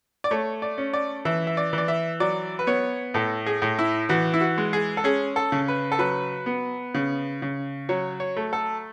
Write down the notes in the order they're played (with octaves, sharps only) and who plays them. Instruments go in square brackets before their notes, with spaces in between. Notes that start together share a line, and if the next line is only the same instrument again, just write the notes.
[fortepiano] D5
A3 C#5
D5
C#4
D5
E3 E5
E5
D5
E3 D5
E5
F#3 D5
B4
B3 C#5
A2 A4
G#4
A2
E4
E3 F#4
E4
F#4
G#3
G#4
A4
C#4 G#4
A4
C#3
B4
A4
F#3 B4
B3
C#3
C#3
F#3 C#5
C#5
A3
A4